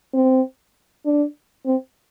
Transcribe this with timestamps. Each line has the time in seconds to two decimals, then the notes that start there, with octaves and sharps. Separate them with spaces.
0.14 C4
1.06 D4
1.66 C4